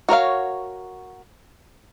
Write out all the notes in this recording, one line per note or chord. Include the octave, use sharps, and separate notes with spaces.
F#4 A#4 C#5 F5